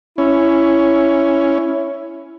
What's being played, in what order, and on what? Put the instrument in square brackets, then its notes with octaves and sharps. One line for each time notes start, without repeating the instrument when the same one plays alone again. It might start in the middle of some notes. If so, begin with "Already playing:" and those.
[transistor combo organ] C#4 [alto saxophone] E4